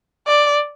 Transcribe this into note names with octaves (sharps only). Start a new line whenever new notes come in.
D5